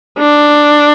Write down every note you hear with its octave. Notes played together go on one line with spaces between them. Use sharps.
D4